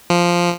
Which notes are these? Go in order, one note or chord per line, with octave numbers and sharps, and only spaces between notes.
F3